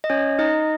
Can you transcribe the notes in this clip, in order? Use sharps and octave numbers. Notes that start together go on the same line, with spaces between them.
D#5
C#4 C#5
D#4 D#5